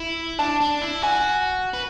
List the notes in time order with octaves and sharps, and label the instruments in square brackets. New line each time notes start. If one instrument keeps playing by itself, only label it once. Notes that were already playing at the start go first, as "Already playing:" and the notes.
Already playing: [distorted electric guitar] E4
[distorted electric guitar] D4 [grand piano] A5
[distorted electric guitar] D4
E4
[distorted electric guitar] F#4 [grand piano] G#5
[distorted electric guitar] B4